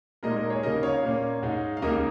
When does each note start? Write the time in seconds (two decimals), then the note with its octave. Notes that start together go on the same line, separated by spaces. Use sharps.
0.23 A#2 G#3 D#4 A#4 D#5
0.36 A#4 D#5
0.50 G#4 C#5
0.63 C#3 A#3 D#4 A#4 D#5
0.83 C#5 F5
1.03 A#2 A#3 C#4
1.42 G#2 G#3 D#4
1.77 F5
1.82 C#2 C#3 A#3 D#4 A#4 D#5